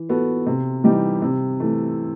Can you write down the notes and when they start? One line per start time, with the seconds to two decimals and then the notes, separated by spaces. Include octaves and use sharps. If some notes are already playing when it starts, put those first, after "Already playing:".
Already playing: E3
0.09 B3 F#4 A4
0.47 C3
0.84 E3 G3 D#4 G4
1.22 C3
1.60 E3 A3